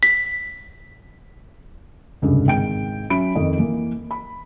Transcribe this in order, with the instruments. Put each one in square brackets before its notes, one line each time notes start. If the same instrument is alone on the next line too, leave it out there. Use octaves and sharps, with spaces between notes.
[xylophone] B6
[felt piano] F1 C#2 G2 D3
G#1 G#3 G5 D7
F#3 C#4 E5 B5 D7
F2 D#3 D#5
E3 A#3
B5